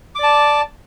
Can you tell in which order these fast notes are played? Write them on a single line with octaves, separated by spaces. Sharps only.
D6 D5 A5